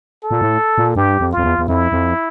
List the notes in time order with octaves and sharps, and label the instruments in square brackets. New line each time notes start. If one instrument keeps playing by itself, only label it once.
[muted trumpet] A4
[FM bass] A#2
A2
A#2
[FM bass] G2 [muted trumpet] G4
[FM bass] F2
[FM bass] F2 [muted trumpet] F4
[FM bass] E2
E2
[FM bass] F2 [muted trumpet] E4
[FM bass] F2